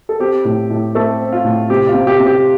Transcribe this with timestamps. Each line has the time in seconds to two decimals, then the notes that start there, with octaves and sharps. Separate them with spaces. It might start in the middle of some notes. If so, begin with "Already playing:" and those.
0.09 A4
0.20 C4 G4
0.45 A2
0.70 A2
0.94 A3 C4 A4
1.20 C4
1.32 F4
1.44 A2
1.70 C3 G4
1.89 F4
1.94 C3
2.07 G4
2.20 C3
2.27 G4